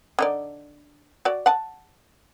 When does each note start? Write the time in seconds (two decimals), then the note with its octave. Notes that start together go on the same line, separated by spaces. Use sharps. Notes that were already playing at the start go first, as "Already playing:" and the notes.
0.19 D3 D#4 D5
1.25 F#4 D5
1.46 F#5 A5